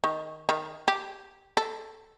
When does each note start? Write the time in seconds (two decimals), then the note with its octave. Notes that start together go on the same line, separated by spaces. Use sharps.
0.04 D#3
0.49 D#3
0.88 G4
1.57 A4